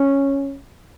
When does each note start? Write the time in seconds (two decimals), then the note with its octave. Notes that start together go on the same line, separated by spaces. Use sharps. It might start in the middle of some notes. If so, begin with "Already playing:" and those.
Already playing: C#4